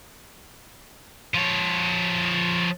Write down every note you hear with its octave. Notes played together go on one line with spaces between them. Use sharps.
F3 C#5